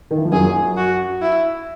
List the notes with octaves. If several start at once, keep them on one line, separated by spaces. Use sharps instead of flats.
D#3
E3
F3
F#2 F#3 G#4
F#4
E4